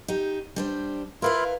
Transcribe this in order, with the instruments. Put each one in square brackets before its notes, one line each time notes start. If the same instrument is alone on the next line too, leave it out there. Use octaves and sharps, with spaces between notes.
[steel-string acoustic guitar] D#4 G4
G3 D4 C5
[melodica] E4 F4 [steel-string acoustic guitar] A#4 B4 F5